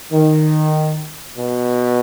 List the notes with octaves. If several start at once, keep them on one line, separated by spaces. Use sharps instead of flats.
D#3
B2